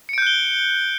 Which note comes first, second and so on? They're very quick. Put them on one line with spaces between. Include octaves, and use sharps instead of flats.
C#7 D7 G6 F#6 G7